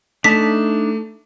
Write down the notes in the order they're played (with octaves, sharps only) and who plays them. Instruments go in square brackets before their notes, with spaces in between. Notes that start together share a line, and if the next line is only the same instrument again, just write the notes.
[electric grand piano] A3 [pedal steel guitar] D4 D#4 A5 [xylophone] B6